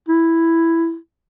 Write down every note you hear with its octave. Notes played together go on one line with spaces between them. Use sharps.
E4